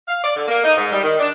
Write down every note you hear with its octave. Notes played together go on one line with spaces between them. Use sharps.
F5
D5
D3
A#3
D#4
G#2
G3
D#3
D4